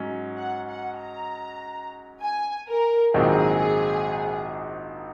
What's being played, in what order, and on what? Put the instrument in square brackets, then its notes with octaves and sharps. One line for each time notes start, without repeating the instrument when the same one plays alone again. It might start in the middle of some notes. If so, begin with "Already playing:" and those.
Already playing: [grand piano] G#2 F#3 C#4
[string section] F#5
F#5
A#5
G#5
A#4
[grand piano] A#1 G#2 D#3 F#3 C4 [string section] G#4